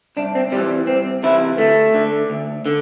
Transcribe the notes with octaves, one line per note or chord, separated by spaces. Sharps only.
C2 D4
C4
C3 E3 G3
C2 C4
C3 E3 E4
D2 A3
D3
D2
D3